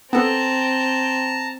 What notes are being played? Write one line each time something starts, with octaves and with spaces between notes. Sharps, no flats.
B3 C4 A4 A5 A#5